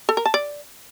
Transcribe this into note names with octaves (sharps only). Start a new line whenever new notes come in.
A4
A#4
A5
D5